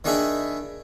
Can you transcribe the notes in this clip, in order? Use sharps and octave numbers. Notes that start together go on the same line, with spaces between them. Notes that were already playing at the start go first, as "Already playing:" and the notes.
D#3 D4 G#4 E5 B5